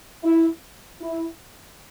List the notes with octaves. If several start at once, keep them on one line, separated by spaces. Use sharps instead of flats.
E4
E4